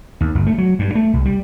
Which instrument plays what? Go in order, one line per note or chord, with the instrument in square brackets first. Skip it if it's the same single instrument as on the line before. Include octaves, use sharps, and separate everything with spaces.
[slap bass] D#2
G1
A3
F#3
G2
A3
C2
G3